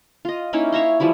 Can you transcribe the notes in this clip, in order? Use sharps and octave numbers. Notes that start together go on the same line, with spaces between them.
F4 D#5
A#3 C#4 D#4 E4
C#5 E5 A#5 C6
E3 F3 G3 E4